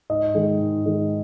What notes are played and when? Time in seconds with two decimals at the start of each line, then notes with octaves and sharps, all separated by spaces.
0.09 G#2 D#5
0.35 D#3 G#3
0.60 G#2
0.85 D#3 G#3